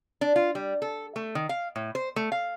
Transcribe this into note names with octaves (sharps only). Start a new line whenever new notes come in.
D4
F4
G3
A4
A3
D#3
F5
A2
C5
A3
F5